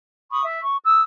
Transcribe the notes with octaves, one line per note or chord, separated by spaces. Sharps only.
B5 C#6 D#6
E5
C#6
D#6 E6